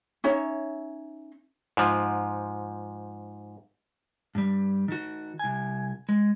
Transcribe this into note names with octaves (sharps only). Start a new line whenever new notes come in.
C#4 D#4 C#5 E5
G#2 F3
G2 G3
D#3 F#4
C2 G#5
G#3